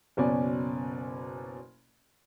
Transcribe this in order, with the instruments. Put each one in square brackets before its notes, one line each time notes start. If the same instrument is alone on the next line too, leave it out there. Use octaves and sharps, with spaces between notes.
[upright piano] F#1 B2 C#4 D5 G#5